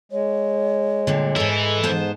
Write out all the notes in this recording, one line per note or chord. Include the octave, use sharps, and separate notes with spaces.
G#3 C#5
G2 A#2 D3
G#2 E3 E4 A4
G#2 B3 C5 A5